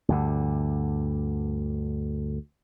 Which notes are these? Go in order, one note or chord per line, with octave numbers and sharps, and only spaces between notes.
D2 G2 D3